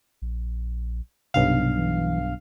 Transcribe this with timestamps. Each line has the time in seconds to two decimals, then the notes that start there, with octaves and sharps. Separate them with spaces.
0.22 A#1
1.34 B1 G2 C3 F5
1.78 E3